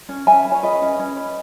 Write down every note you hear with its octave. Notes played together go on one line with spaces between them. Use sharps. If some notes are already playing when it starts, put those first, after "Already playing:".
C#4
C#4 E5 G#5
B4
C#5
G#4 B4 D#5
C#4
C#4
B4